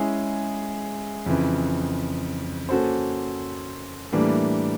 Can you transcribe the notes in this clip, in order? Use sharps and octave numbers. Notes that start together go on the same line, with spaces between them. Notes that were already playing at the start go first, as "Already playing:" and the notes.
Already playing: G#3 C#4 E4 G#4
F2 C#3 E3
A#3 C#4 F#4 A4 C5
A2 E3 G3 A#3 D4